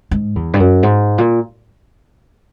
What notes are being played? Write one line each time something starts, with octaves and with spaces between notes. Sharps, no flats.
G#2
E2
G2
F#2
G#2
A#2